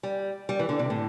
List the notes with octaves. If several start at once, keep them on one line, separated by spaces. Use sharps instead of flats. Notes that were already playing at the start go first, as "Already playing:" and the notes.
G3
G3
E3
D3
C3
A2